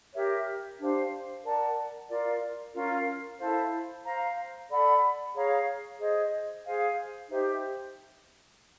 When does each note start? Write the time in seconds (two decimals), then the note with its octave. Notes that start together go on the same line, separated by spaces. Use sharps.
0.14 G4 A#4 C#5 E5
0.78 D4 G4 C5 F5
1.44 A#4 D5 F#5 A5
2.08 F4 A#4 D5
2.74 C#4 F4 A#4
3.39 E4 A4 C5 F5
4.04 C5 F5 A#5
4.69 A4 D5 F#5 B5
5.34 G#4 C#5 F5 A#5
5.99 G#4 C5 D#5
6.64 G#4 C5 F5 G#5
7.29 D#4 G4 C5 E5